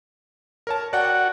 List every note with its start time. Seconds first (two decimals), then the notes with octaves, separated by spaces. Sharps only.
0.67 A#4 C#5 A5
0.93 F#4 D5 F#5 G5